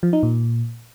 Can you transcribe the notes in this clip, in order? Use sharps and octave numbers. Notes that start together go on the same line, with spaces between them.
F3
D#4
A#2